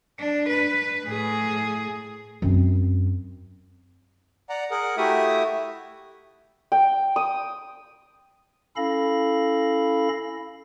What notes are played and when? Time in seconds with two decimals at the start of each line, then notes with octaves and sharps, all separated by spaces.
0.20 D4
0.50 B4
1.05 A2 G#4
2.42 F#2 C4
4.49 D5 F#5 A#5
4.71 G#4 A#4 F#5
4.97 A3 E4 F#4 G4 E5 D#6
6.72 G5
7.16 D#6
8.76 C#4 E4 A4 F5 B5 A#6